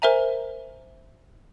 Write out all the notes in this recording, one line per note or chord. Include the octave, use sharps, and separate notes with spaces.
A#4 C5 E5 G#5 A#5